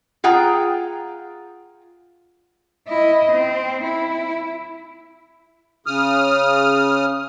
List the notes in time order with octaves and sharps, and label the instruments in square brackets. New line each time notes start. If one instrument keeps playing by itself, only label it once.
[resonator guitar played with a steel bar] F4 G#4 F#5 G5 A#5
[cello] E4 D#5
C4
E4
[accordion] C#3 D#6 F6